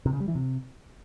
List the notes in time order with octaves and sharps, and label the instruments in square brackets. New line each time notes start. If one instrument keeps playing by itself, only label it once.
[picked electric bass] C3
C#3
G3
E3
C3